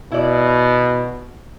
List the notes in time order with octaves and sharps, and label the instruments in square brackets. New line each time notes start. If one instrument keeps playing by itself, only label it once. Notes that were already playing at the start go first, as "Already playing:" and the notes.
[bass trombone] B2 [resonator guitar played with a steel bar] E4 D5